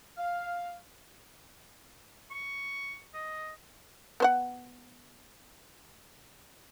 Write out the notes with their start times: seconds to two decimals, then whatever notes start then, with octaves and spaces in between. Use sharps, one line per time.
0.17 F5
2.31 C#6
3.14 D#5
4.20 B3 C5 F#5